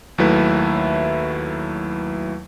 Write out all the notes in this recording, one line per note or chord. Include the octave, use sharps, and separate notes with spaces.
D#2 F#3 A3 E4 B4 E5